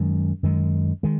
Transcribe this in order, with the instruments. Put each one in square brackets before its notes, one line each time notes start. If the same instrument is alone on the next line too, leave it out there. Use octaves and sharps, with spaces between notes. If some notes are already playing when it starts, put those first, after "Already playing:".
Already playing: [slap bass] F#2 D#3 G#3
F#2 D#3 G#3
D#3 G#3